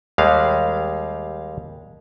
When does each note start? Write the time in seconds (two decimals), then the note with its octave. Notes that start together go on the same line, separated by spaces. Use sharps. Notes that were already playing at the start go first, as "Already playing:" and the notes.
0.18 D#2 G3 G#3 F5